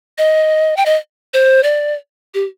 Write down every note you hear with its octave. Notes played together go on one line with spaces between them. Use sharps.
D#5
G5
D#5
C5
D5
G4